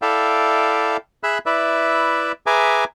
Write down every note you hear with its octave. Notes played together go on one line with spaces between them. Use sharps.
E4 A4 D5 E5 F5 G5
G#4 E5 B5 E6 F#6
E4 B4 D5 E5
G#4 B4 E5 G#5 A#5 D6